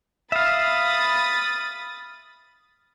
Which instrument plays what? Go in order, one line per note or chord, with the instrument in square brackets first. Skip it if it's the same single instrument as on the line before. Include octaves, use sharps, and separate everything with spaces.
[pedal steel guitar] E5 F5 [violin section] B5 D#6 A6